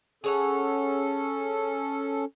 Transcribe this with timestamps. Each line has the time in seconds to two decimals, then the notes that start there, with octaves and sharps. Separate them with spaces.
0.24 C#4 G#4 A4 C#5 F#5